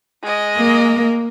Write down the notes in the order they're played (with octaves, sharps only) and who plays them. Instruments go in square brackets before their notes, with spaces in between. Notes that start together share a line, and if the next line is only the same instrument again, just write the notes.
[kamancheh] G#3 D#5
[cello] A#3